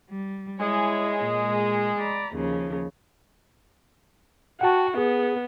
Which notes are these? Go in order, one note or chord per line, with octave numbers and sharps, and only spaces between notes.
G3
G#3 E4 G#4 C#5
A#2
D5 A#5 B5
D#2 C#3 F3
F#4 F#5 G5 A5
B3 G#4